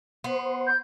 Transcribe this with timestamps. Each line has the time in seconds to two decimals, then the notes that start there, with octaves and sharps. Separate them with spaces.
0.24 B3 C5
0.67 G6